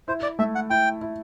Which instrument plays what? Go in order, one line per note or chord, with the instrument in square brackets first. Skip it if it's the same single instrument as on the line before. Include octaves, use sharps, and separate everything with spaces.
[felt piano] E4 [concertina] C5
[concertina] D5
[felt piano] A3 [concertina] E5
[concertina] F#5
[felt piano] E4 [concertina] G5
[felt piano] E4